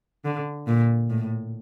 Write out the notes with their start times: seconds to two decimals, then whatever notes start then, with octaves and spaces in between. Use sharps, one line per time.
0.25 D3
0.67 A#2
1.10 A2